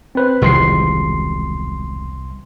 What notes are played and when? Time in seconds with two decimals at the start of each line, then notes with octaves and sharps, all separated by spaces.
0.15 C4 B4 C5
0.42 E1 C2 D#3 F3 C6 C7